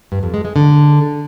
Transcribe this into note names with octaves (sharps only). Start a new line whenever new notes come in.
G2
F2
G#3
G#3
D3